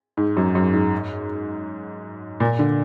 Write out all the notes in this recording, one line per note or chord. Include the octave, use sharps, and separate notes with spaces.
G#2
F#2
F#2
G#2
A#2
D3